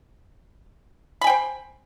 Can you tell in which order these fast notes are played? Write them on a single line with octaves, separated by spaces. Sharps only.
B5 G#5 G5 C5